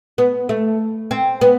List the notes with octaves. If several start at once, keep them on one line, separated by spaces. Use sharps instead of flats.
B3
A3
C4
B3